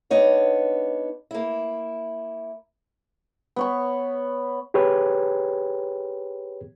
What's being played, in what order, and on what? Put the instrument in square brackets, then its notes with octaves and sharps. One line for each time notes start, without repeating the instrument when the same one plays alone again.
[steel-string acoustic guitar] B3 D4 D#4 C#5
A#3 E4
[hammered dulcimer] B3 C#5 C#6
[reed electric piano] G4 G#4 B4 C#5 G5